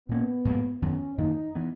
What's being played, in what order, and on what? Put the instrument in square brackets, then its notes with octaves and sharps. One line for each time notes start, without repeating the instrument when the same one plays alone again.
[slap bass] A#2 A#3 C#4 [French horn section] B3
[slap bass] G#2 F#3 A#3
[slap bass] F#2 D#3 F#3 B3 [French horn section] C#4
[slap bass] F#2 D#3 A#3 [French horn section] D#4
[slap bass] E3 B3